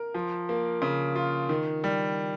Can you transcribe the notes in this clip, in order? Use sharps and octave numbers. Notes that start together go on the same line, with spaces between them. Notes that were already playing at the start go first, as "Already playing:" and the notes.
Already playing: A#4
F3
A#3
C#3
F4
D#3
G3